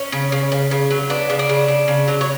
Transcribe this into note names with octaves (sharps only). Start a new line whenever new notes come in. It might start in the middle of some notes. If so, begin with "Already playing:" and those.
Already playing: C#4
C#3
C#3
C#3
C#3
F#3
B3 D4
C#3
D4
C#3
C#3
C#3
F#3
C#5